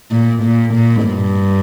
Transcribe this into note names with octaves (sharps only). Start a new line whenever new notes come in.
A#2
A#2
A#2
G2